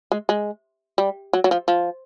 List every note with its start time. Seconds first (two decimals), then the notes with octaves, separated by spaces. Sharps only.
0.12 G#3
0.29 G#3
0.98 G3
1.33 F#3
1.44 F#3
1.51 F3
1.68 F3